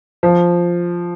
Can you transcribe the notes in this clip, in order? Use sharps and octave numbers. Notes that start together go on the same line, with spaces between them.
F3